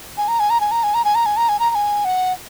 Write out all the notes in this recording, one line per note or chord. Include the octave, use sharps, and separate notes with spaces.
G#5
A#5
G#5
A#5
G#5
A#5
G#5
A#5
G#5
A#5
G#5
A#5
G#5
A#5
A#5
G#5
F#5